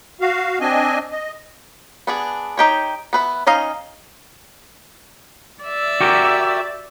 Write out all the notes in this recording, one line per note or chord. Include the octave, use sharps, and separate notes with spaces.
F#4 F5
C4 D4 D#5 G#5
D#5
B3 D4 G#4
D#4 G4 C#5
B3 B4 E5
C#4 D#4 D#5 F5
D5 E5
F#4 G4 A#4